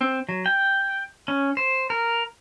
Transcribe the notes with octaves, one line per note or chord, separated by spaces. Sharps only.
C4
F#3
G5
C#4
C5
A#4